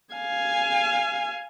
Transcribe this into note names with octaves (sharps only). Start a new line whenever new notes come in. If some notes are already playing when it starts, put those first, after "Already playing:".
F5 G#5